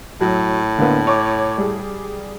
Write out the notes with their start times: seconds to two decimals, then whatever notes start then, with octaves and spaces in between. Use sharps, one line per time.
0.21 A2 F#3
0.78 D3 A#3 B3
1.07 C#5 D6
1.58 G3 G#4